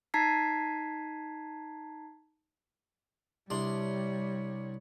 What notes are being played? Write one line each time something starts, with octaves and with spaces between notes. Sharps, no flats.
D#4 A5 A#5 G#6 B6 C7
C2 G3 D4 C#5 C6